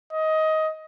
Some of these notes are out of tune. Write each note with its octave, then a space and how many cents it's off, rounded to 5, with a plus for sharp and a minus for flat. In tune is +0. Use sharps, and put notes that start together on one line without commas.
D#5 +15